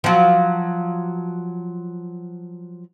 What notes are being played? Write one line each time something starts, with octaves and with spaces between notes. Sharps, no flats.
F3 F#3